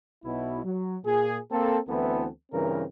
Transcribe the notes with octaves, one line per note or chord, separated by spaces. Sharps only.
B1 B2 E4
F#3
A#2 G#4
A#3 C4 A4
D2 E3 B3 C4 E4 A4
G2 C#3 E3 C4 A#4